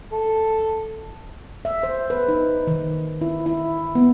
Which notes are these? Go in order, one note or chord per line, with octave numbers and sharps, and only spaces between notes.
A4
E5
C5
B4
D#4
D#3
E4
E4
B3